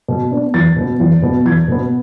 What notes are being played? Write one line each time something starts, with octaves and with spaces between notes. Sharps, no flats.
B2
B3 D4
E2 A6
B2 B3
E2
B2 B3
E2 G#6
B2 B3